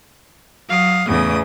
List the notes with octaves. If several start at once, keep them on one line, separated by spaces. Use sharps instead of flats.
F#3 F5 D#6
E2 A2 C#3 D#6